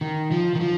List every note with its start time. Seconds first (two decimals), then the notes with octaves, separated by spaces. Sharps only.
0.01 D#3
0.31 F3
0.55 D#3
0.61 F3